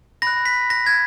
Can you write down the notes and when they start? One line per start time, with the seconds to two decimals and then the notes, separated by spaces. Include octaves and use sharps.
0.22 B5 F#6 A#6
0.46 B6
0.70 A#6
0.86 G#6